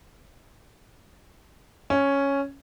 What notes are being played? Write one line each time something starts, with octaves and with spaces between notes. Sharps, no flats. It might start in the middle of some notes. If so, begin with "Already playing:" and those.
C#4